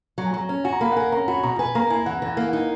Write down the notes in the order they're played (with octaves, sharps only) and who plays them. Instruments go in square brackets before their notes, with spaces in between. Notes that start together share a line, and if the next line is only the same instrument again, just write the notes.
[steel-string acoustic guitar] F#3 [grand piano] A#5
[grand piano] G#5
[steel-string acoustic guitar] F#3 [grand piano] A#5
[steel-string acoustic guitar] C#4
[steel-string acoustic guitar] F#4 [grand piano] G#5
[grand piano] A#5
[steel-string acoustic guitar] A#3 [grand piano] B5
[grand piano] F#5
[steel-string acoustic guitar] A#4 [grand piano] G#5
[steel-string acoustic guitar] C#4 [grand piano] A#5
[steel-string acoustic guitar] F#4 [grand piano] B5
[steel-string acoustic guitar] B2 [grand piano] A#5
[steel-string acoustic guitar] B4 [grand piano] G#5
[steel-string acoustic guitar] A#3 [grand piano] A#5
[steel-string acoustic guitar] E4 [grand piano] G#5
[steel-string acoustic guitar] E3 [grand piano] F#5
[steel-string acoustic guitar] E3
[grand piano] F#5
[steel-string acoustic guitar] A#3
[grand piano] F#5
[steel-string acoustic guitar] D#4